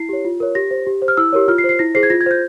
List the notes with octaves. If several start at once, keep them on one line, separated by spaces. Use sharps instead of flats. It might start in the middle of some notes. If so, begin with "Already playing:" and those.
Already playing: E4 C7
G4 C#5
F4
A#4 C#5
G4 A#6
C5
G4
C5
F6
E4 E6
G4 A#4 C#5
F4 F6
C7
C5
C7
E4 A#6
G#4 C5 C7
G#6
F4 A#6
G#6
C5 G6